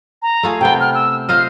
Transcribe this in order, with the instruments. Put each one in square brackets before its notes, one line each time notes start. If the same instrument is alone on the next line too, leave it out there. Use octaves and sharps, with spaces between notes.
[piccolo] A#5
[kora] A3 F4 G#4
[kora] C3 B3 [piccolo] G5
[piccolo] F6
E6
[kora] F4 C5 D#5 [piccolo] F6